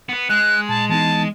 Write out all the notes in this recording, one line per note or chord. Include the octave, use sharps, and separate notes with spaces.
B3 B4
G#3 F#6
A#2 A5
E3 B3 D#4 A5